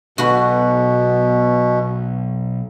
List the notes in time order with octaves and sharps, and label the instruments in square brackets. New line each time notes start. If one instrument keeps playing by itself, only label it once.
[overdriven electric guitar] B1 [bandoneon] B2 [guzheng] F#4 B4